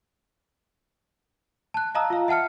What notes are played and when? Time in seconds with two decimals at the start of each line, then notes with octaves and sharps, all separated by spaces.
1.74 A5 F#6
1.95 D#5 F5 A5 A#5 D#6 E6
2.10 F4 F5
2.28 E5 F#5 A5 F6 C#7